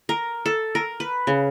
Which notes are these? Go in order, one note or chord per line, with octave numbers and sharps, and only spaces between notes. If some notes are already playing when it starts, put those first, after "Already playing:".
A#4
A4
A#4
B4
C#3